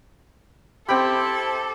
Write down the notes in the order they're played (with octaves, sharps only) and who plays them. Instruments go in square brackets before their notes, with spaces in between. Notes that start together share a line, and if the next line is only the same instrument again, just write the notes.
[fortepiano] C4 G5 B5 [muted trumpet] E4 [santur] G4 [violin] A4